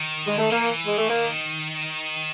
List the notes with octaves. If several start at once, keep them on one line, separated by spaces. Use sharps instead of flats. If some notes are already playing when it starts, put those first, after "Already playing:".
Already playing: D#3
G#3
A3
E3 A#3
G#3
A3
D#3 A#3